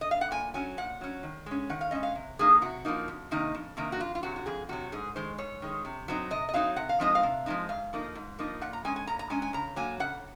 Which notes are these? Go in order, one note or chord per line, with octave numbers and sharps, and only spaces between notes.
D#5
F5
F#5
A#2 G#5
F#3 C#4 G#5
A#2 F#5
F#3 C#4
D#3
G#3 C#4
D#3 F#5
F5
G#3 C#4 D#5
F5
C3
F3 A#3 D#4 G#4
C3 F#4
F3 A#3 D#4
F2
C3 D#3 A#3 D#4
F2
C3 D#3 A#3 D#4
F#4
F2 F4
F4
C3 F#3 F#4
F#4
F2 G#4
C3 F#3 F#4
G#2 G#4
D#3 G#3 C5
G#2 C#5
D#3 G#3
C3
F#3 C4 D#4
C3 D#5
D#5
F#3 C4 D#4 F5
C3 F#5
F5
F3 G#3 C4 D#4 D#5
F5
C3
F3 G#3 C4 D#4
G#2 F5
F3 A#3 D#4
G#2
F3 A#3 D#4
A#2 F#5
A#5
G#3 C#4 G#5
G#5
A#2 A#5
A#5
G#3 C#4 G#5
G#5
C#3 A#5
F#3 A#3 G#5
C#3 F#5